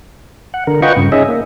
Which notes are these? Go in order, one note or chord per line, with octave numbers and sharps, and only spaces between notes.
F#5
D3 A#4
F4 B4 D#5 F#5 G5 C#6
G2 C#3
C#4 D#4 G#4 D#5 E5
A#3